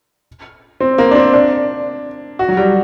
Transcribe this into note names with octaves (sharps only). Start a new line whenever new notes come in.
C4
A#3
D4
C4
D4
F#4
F#3
G3